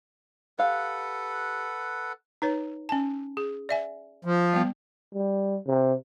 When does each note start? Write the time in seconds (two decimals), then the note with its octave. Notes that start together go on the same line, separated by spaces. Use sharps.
0.59 G4 A4 B4 F5 F#5
2.42 D#4 B4 C#5
2.89 C#4 A5
3.37 G#4
3.69 D5 E5 G#5
4.25 F3
4.53 G3 B3
5.15 G3
5.67 C3